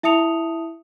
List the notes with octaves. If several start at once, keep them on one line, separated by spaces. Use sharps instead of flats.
E4 E5 A5 D#6 C#7 F7